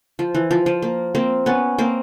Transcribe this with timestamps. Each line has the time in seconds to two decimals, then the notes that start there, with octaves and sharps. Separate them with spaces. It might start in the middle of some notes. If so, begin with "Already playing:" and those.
0.19 F3
0.35 E3
0.51 F3
0.66 F3
0.82 A#3
1.15 A#3 C4
1.46 B3 C#4
1.78 A#3 C4